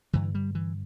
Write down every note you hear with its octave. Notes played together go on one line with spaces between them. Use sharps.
G2 D3 E3
G3
E3